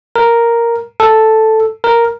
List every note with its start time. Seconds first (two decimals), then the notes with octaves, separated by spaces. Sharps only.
0.16 A#4
1.00 A4
1.84 A#4